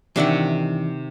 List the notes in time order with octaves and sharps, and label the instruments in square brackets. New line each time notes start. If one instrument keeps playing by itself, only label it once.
[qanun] C3 D#3 F#5 [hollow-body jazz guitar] E3 D4 E5